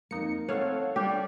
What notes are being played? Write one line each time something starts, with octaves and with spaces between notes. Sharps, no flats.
F2 A#3 D#4 C#7
A3 C4 A4 C#5 F5 F#5
G3 C#4 D4 F4 G4 C#5